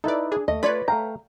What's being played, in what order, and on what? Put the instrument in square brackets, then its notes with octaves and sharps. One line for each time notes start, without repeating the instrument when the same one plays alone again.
[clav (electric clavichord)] D#4 E4 B4 [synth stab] A4 D5
[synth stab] D4 G#4
[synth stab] D#2 [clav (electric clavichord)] A3 [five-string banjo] D#5
[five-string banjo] F4 D5 [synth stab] B4 C#5 B5
[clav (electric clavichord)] A3 F5 G5 [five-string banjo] A#5